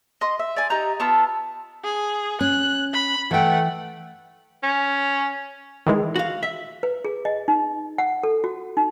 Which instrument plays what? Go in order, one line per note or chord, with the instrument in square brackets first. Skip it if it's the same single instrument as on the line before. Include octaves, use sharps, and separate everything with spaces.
[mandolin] D#5 C6
E5
D5 G#5
D#4 G4 A#5 G6
B3 F4 A5 E6
[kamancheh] G#4
[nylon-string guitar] C#4 [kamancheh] F#6
[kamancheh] B5
[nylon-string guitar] E3 G5 [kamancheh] A3 F#5
[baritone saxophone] C#4
[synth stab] D#3 E3 G#3
[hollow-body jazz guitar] F#4 F5
E5
[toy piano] B4
G#4
D#5
D#4
F#5
A4
F#4
D#4